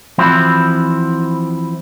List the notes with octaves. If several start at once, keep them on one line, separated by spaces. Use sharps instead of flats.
E3 F3 C4 E4 F#4